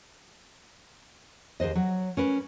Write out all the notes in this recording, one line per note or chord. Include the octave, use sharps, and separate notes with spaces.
D#2 G#4 C5 D#5
F#3
C#4 A#4 B4